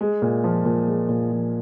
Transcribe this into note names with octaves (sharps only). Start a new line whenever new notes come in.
G#3
A#2
F3
A#2
G#3
A#2
F3